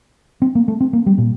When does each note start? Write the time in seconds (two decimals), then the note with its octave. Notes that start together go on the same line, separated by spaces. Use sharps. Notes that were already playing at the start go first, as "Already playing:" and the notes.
0.42 C4
0.55 A#3
0.68 A3
0.81 C4
0.93 A#3
1.06 G3
1.18 A#2